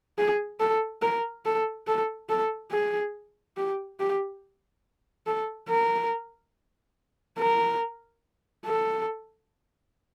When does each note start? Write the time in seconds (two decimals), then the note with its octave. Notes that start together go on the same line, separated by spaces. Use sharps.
0.18 G#4
0.60 A4
1.02 A#4
1.45 A4
1.88 A4
2.29 A4
2.72 G#4
3.57 G4
4.00 G4
5.27 A4
5.69 A#4
7.39 A#4
8.66 A4